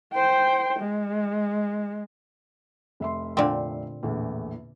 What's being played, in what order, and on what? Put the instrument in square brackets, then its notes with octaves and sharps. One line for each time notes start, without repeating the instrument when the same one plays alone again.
[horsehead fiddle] C5 G5
G#3
[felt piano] F1 E5 C6
[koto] A#2 D3 C4
[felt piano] A#1 E2 A2